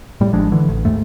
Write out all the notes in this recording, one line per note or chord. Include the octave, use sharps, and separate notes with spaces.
A2 G3
A1 F3 G#3 D4
D3 E3
A1
D#2 G#2 A3